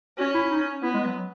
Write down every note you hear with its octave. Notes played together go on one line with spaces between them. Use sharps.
C#4 F#4
E4
D#4
B3 E4
G#3
F#3